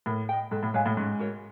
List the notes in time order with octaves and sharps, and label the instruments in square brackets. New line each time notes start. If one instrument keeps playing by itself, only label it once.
[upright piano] A2 [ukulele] A#4
[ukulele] D#5 G5
[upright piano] G#2 [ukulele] A4
[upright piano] A2
[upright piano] G#2 [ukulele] C#5 F5 G#5
[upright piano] A2
[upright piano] G#2 [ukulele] C#4
[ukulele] F#4 A#4 C#5